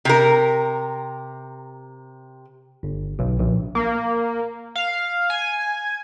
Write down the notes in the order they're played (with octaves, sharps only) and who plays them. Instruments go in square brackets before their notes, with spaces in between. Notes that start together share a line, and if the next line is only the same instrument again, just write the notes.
[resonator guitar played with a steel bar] C3 A#4
[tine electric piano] G1
B1
A#1
[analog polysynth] A#3
F5
G#5